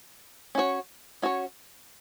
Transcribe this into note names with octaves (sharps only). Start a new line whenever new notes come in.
C#4 F#4 C#5
C#4 F#4 C#5